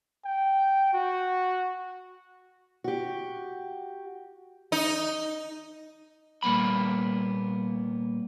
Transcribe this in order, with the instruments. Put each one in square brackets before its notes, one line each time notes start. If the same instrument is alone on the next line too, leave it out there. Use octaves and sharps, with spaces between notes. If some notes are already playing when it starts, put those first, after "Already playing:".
[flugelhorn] G5
F#4
[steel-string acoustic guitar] F#4 G4
[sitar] D#4
[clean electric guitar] A#2 G3 A#3 B3 B5